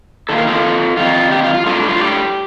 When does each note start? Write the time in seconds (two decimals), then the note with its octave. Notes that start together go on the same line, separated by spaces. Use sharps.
0.29 D#3 A#3 F4 A4
0.38 A#4
0.47 F4 A4
0.97 D#3 G3 C4 D#4 F4
1.31 G4
1.43 F4
1.54 F4
1.66 A2 G3 D4 F4 A4
1.89 F4
2.01 G4